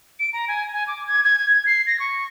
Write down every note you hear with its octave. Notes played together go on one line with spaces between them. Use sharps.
D7
A#5
G#5
G#5
D6
G#6
G#6
G#6
C7
A#6
C#6